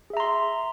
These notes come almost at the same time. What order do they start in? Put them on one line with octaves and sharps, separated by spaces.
G#4 E5 A#5 C6